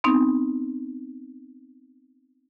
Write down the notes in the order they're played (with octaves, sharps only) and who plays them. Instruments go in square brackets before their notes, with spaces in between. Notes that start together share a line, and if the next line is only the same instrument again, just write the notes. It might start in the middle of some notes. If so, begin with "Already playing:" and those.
[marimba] B3 C4 D#4